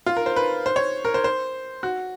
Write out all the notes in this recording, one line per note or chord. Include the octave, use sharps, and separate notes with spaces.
F4
A#4
C5
B4
C5
C#5
A#4
C5
C5
F#4